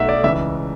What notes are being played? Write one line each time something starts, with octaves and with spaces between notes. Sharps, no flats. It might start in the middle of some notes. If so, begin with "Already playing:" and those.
Already playing: B1 B2 A3 E5 F#5
D5
C#2 C#3 E3 E5